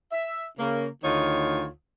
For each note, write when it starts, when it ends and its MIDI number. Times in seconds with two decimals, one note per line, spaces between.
0.12 0.46 76
0.59 0.88 49
0.59 0.88 58
1.04 1.67 38
1.04 1.67 51
1.04 1.67 63
1.04 1.67 65
1.04 1.67 73